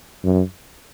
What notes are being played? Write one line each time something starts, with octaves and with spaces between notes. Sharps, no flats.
F#2